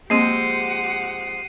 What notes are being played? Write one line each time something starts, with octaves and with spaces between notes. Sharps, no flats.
F3 G#3 A#3 C4 G4 F#5 C7 D#7